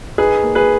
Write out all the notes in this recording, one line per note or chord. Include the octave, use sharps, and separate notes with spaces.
D#4 G#4 B4
A#3
G#4 B4